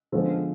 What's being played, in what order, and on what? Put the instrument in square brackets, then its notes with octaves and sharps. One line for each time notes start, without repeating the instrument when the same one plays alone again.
[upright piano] D3 F3 G#3 B3 A4 C5